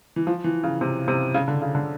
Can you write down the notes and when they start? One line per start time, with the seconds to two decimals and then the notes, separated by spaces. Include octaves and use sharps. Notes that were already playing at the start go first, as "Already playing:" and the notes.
0.16 E3
0.27 F3
0.44 E3
0.64 C#3
0.81 C3
1.08 C3
1.34 C#3
1.48 D3
1.62 C#3
1.75 D3